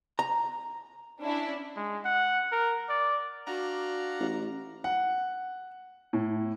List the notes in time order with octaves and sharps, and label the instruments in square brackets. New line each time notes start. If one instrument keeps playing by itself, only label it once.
[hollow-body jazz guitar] A#5
[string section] C#4 D4 E4
[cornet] G#3
F#5
A#4
D5
[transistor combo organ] D4 F5 F#5 [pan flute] F#4 [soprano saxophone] A#5
[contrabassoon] A1
[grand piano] F#5
A2